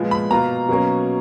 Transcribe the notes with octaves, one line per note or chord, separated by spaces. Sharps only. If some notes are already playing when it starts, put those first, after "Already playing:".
Already playing: A#2 F3 G#3 B3 F4
B5
B2 A#3 F4 A#5
B2 F#3 A#3 C#4